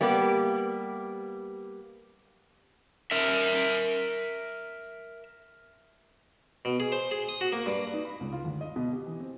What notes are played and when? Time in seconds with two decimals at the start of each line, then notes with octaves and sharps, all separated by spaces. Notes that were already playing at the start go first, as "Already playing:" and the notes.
0.01 G3 A#3 B3 G4
3.11 A#4 E5
6.65 B2
6.80 G#4
6.92 C5
7.11 G#4
7.29 D#6
7.41 F#4
7.52 A#3
7.66 G2
7.93 D#4
8.05 B5
8.21 C#2
8.32 F4
8.44 D2
8.61 D#5
8.76 B2
8.93 G4
9.06 E3
9.20 C4